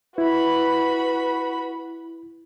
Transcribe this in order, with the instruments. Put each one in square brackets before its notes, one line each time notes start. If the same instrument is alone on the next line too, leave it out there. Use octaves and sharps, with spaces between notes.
[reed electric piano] E4 [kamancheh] F#4 B5 [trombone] B4